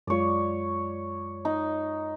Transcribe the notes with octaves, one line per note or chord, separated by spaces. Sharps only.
F#2 G#3 F4 C#5 D5
D#4